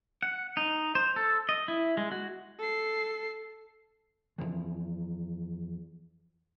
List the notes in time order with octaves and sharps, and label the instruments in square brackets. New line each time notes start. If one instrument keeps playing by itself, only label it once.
[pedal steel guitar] F#5
D#4
C5
A4
D#5
E4
G#3
F#4
[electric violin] A4 C7
[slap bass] F2 C#3 E3 F3